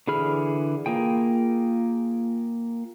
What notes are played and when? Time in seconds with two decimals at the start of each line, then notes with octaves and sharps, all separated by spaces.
0.07 D3 E3 G#4 B5 F6
0.86 A#3 F4 G#4 G5